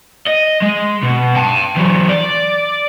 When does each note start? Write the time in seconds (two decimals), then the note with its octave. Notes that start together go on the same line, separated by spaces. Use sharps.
0.27 D#5
0.63 G#3
1.03 B2
1.36 G5 A5
1.76 E3 F#3
2.09 D5